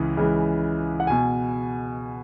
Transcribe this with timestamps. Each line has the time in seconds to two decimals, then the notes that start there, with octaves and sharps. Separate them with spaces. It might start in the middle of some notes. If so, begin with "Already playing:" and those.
Already playing: C#2 C#3 E3
0.17 C#2 C#3 E3
1.00 F#5
1.07 B2 G#5